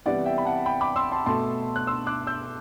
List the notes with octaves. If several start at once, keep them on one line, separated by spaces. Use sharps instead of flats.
C3 E3 G3 B3 D5 F#5
E5 G5
B5
F#5 A5
G5 B5
B5 D6
C6 E6
A5 C6
B2 A3 A5 C6
F#6
C6 E6
D6 F#6
E6 G6